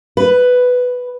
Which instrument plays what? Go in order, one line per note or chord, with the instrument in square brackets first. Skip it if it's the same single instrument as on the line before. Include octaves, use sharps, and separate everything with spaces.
[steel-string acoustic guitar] B4